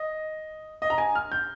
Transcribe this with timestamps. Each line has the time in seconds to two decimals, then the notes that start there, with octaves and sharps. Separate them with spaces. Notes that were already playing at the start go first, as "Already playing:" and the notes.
Already playing: D#5
0.82 D#5
0.90 A#5
0.98 G#5
1.15 F6
1.32 G6